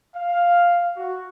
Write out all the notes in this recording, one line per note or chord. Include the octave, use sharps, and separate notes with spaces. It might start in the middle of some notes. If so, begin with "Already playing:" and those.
F5
F#4